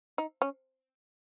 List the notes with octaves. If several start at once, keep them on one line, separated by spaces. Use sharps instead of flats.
D#4
C#4